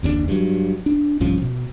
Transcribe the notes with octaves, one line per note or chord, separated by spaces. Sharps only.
F#1 D#2 A2 D4
G2 F#3
D4
B1 G2 F3 C#4
B2